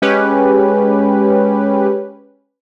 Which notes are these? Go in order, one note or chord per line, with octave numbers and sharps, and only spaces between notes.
G#3 C#4 G4 B4